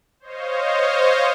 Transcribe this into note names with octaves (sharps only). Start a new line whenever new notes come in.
C5 C#5 D#5 F5